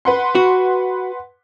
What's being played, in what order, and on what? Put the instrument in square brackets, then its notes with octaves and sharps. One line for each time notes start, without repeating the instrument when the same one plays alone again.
[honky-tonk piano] B4 F#5 C6
[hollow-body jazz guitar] F#4